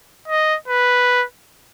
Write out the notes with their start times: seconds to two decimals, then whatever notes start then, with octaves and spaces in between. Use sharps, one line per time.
0.28 D#5
0.68 B4